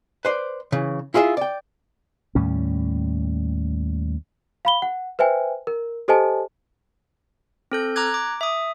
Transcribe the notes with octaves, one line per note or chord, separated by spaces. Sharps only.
B4 C5 D5
C#3 E3
E4 F4 G#4 D#5 E5
D5 G5
D#2 A2 G3 C#4
F5 B5 G7
F#5
B4 C5 E5 G5 G#5
A#4
G4 A4 C5 D#5 G#5 A5
C4 A4 G6
A#5 D6 F#6 G#6
D6
E5 D#6